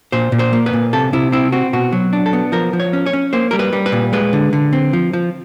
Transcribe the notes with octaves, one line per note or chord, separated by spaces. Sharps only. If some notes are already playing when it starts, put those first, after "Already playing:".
A#2 C5
A#2
C5
A#3
B4
A#2
C3 A4
C3 E4
C4 E4
C4 F#4
B2 F#4
F#3
D4
A4
B3
F3 A#4
F3
C#5
C#4
C#5
C#4
A#3 C5
G3 A#4
B4
G3
B4
A#2
G#3 B4
D3
D3
C4
F3
F3